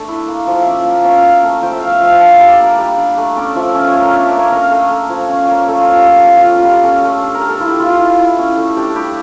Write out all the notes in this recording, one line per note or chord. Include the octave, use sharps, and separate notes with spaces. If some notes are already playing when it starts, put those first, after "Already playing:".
Already playing: A3 D4 D5
E4
A#3
F3
C#4 D5 E5
A#3
C#4 E5
F5
A#3
E5
A3 A5
A5
F3 G5
E5
A3 F5
E5
F3 F5
G5
D4 A5
E5
G3
D5
A#3
G3
D4
A3
C#4 D5
F3 E5
C#4 E5
C#5
A3
A#4
D4 E5
D5
A#3
C#5
C#4 A#4
A3
A3
F3
C#4
A#3
A3 A4
F4
F3
G4
A#3 A4
F4
F4
C#4 G4
F4
G3
G4
C#4 A4
A3 A4
D4
A#4
G3
A4
E4 F4
G4
E4 F4
F4
E4
E4
C#4
A3
D4 G4
G3 G4